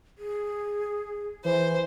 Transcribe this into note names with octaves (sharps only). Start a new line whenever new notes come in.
G#4
E3 C5